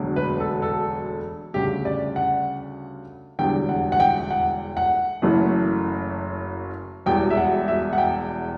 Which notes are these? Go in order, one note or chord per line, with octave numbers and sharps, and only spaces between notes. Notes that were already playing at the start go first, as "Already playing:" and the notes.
Already playing: E1 D2 D3 F#3
B4
A4
A4
D2 C#3 G3 G4
D5
F#5
E1 E2 D3 G3 G5
F#5
F#5
G5
F#5
F#5
F#1 F#2 E3 A3
E1 E2 B2 G3 G5
E5
F#5
E5
F#5
G5